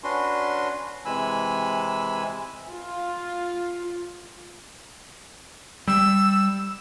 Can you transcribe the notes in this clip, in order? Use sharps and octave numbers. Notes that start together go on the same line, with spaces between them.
C#4 D4 F#4 B4 C6
C3 E3 G#3 G#5 B5 E6
F4
G3 E6